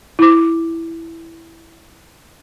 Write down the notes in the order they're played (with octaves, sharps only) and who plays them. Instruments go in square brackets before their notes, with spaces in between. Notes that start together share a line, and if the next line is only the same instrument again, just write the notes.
[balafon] E4 D6